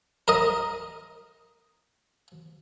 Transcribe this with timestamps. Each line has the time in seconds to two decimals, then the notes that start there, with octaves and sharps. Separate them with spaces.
0.28 A#4 D#5